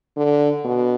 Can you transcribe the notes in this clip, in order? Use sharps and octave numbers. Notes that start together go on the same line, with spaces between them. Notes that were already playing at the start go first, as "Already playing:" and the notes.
D3
B2